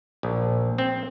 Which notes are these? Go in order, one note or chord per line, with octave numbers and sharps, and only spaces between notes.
A#1
C4